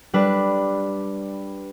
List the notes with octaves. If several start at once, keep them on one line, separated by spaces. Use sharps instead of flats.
G3 D4 B4